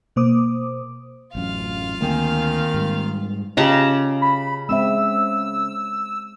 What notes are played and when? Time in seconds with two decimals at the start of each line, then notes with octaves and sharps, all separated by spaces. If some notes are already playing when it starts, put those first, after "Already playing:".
0.16 B2 A#3 C5 D6 D#6
1.35 A1 F#2 F4 F5
2.01 D2 D#3 A#3 C4 G#5
2.74 G#2 G3
3.57 C#3 F4 G4 D#5 A5 A#5
4.22 B5
4.69 G#3 C4 E5 E6